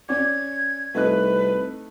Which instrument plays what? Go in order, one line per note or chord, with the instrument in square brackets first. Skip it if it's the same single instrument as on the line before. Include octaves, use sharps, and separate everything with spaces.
[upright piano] C#4 D5 [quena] G#6
[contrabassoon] C2 [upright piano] A3 D#4 F#6 [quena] B4